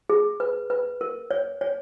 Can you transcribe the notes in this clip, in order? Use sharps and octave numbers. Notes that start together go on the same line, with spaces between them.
G#4
B4
B4
A#4
C#5
C#5